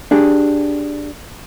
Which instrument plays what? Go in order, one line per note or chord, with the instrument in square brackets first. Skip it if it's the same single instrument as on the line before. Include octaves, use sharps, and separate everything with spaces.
[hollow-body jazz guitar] D4 G4 G#4